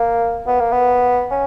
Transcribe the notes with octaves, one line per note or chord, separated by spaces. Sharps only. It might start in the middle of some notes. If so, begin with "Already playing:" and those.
Already playing: A#3
B3
A#3
B3
C#4